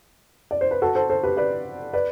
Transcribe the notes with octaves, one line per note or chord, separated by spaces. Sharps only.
D5
C5
B4
F#4 A4
A4 C5
A4 C5
G4 B4
B4 D5
B4 D5